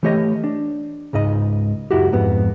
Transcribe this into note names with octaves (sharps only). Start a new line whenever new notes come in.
E3 A3 G4 C#5 D#5
D4
C#2 G#2 D#4 D#5 B5
C#2 F#2 E4 F#4 G4
F2 G#2 B3